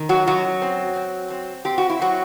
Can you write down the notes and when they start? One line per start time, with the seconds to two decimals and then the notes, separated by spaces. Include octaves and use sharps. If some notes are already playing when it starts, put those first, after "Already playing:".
Already playing: D#3
0.09 F#3 F#4
0.27 F#2 F#3 F#4
0.62 C4
0.96 C4
1.30 C4
1.65 C4 G4
1.78 F#4
1.90 E4
1.99 F#3 C4 F#4